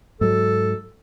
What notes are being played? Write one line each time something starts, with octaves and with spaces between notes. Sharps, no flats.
G#2 F#3 A4